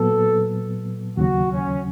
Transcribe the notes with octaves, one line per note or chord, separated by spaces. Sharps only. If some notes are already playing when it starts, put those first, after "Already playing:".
Already playing: A#2 F#3 B3 A4
D#2 C#3 F#3 F#4
C#4